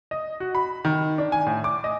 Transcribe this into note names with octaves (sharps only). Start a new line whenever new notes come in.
D#5
F#4
B5
D#3
D4
G#5
A2
D6
D#5